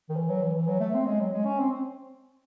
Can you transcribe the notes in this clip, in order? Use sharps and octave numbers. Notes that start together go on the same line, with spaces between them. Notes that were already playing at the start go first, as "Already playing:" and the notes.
D#3
E3
F#3
E3
E3
F#3
A3
C4
G#3
F#3
G#3
C#4
C4
C4